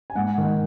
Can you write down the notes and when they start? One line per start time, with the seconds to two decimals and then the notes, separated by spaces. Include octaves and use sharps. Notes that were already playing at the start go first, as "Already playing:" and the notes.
0.10 G#5
0.15 G#2 F#5
0.38 D#3